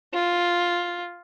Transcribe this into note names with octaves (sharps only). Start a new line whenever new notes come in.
F4